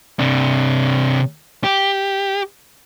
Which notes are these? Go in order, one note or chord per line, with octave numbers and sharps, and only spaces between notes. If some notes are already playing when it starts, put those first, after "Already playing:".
C3 D4
G4